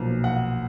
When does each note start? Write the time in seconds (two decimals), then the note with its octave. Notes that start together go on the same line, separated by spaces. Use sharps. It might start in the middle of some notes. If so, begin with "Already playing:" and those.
Already playing: B1 A#2 F3
0.24 F#5